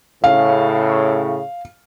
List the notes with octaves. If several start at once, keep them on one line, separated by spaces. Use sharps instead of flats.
A2 C#3 F5